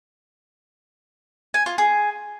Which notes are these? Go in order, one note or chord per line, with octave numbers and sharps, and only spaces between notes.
G#5
F4
G#4